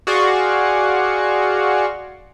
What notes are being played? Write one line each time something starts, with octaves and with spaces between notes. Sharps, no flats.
F#4 G#4 D5 F5 C6 C#6